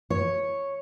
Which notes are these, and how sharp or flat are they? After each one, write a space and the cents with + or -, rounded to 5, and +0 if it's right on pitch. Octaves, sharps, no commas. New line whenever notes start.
C#5 -5